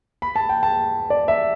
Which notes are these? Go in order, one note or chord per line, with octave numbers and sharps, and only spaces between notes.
B5
A5
G5
A5
D5
E5